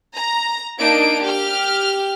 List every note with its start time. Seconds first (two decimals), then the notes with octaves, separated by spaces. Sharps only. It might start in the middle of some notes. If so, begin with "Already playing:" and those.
0.15 A#5
0.80 A#3 D4 D#4 D7
1.24 G4 F6